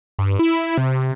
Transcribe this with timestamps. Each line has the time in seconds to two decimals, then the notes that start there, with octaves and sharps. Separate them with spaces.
0.19 G2
0.39 E4
0.78 C3